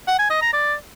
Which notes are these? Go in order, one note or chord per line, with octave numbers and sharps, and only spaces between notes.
F#5
G#5
D#5
A#5
D5